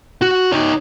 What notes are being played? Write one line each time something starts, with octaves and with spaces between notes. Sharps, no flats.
F#4
D#4 C#5